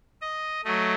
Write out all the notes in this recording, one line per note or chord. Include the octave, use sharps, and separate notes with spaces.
D#5
F#3 A3 D#5